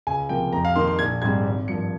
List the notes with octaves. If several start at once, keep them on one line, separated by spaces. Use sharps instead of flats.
C#2 G#5
C3 F3 A#3 G5
F2 A#5
F5
D#3 A#3 C6
C6
A#1 G#6
G#2 G3 C4 G#6
G#1
G2 F3 A#3 C#7